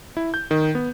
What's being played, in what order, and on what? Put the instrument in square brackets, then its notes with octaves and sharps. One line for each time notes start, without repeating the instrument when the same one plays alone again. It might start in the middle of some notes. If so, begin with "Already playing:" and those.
[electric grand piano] E4
G6
D#3
B3